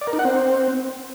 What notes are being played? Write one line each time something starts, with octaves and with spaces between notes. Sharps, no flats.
D5
A#4
D#4
F#5
C4